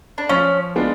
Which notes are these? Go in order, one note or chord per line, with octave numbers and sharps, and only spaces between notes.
D4
F3 C#4
G#3 B3 D4 F4